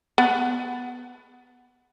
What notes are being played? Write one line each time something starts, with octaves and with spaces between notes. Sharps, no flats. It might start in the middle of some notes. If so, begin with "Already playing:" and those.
B3 F#5